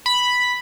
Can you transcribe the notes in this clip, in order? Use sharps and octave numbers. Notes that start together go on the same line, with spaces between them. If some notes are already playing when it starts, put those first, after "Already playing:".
B5